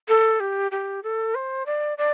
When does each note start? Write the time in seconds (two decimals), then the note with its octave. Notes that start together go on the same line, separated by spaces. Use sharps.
0.08 A4
0.40 G4
0.71 G4
1.03 A4
1.35 C5
1.66 D5
1.98 D5